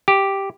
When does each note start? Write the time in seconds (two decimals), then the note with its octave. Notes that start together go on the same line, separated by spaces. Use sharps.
0.08 G4